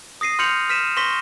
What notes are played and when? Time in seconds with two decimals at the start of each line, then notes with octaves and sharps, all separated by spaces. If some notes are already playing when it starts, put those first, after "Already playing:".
0.21 D#6 A#6 C7 D#7
0.39 C6 F6 G6 C#7 F7 F#7
0.69 F6 B6 D#7 E7
0.97 C6 C#6 A#6 B6 G7